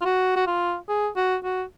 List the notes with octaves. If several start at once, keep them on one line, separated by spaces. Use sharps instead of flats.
F4
F#4
F#4
F4
G#4
F#4
F#4